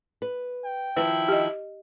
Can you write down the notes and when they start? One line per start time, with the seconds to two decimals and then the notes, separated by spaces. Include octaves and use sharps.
0.22 B4
0.65 G5
0.97 D#3 F3 E4 B4
1.28 G4 D#5